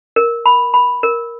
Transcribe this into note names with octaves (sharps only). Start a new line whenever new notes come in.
A#4
B5
B5
A#4